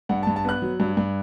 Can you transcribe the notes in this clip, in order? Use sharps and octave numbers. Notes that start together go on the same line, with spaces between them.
G2 F#5
A5
G2
A5
B3 F#6
F#3
G2
G2